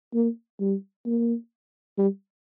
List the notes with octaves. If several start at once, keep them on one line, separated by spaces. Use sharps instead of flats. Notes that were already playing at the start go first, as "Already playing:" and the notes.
A#3
G3
A#3
G3